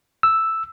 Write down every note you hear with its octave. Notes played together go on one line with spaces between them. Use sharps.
E6